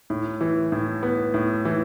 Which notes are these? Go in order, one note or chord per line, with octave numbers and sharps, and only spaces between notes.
A2
E3
A2
B3
A2
E3